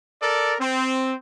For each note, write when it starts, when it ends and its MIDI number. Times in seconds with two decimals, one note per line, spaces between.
0.21 0.56 69
0.21 0.56 70
0.21 0.56 74
0.61 1.13 60